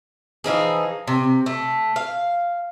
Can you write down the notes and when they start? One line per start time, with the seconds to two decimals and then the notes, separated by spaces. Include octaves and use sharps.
0.44 E3 F3 D#4 G#4
1.07 C3
1.46 A3
1.96 F5